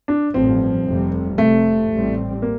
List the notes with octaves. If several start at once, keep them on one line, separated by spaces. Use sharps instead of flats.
D4
A1 G2 F3 C4
F1 F2 C3 G3
F1 F2 C3 A3
A1 A2 G3 C4
A#3